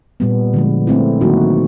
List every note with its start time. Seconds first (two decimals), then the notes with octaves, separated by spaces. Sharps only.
0.20 A#2 G3 B3
0.54 D3 F3 G#3
0.87 A3 C4 E4
1.21 D#3 F#3 A#3 D#4 F#4